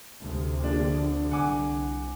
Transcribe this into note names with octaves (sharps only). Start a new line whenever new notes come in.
D2 C3
A#1 D4
D3
C2 F#5 G#5 D6